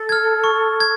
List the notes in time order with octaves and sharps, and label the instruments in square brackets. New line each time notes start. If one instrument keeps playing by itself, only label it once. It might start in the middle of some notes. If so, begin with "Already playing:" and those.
Already playing: [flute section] A4
[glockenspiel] F6 G#6
C#6
G#6